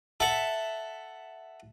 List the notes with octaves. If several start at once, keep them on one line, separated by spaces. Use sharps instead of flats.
A4 E5 F#5